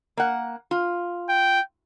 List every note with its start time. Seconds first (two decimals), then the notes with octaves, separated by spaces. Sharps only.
0.17 A#3 F#5
0.71 F4
1.29 G5